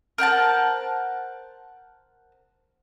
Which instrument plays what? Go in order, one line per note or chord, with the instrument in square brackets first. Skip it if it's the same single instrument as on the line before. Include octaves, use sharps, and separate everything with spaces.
[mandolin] A#4 C5 F#5 A5